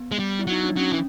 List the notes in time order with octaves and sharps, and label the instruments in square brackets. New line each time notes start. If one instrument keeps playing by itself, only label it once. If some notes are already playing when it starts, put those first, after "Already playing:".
Already playing: [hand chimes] B3
[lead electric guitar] G#3
G3
[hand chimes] E4
[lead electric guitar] F#3 [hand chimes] D#4
[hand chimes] D4
[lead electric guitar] F#3 [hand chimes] C#4
[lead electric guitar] E3